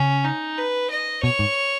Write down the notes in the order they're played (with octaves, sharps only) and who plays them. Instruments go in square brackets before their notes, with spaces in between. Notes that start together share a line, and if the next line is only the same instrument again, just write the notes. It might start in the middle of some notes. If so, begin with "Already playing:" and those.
Already playing: [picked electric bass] C#3 [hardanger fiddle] C#4
[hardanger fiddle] D#4
B4
D#5
[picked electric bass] B2 [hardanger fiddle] C#5
[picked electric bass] G#2